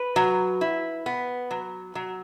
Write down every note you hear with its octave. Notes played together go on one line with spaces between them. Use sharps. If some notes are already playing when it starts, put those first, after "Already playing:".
Already playing: B4
F#3
E4
B3
F#3
F#3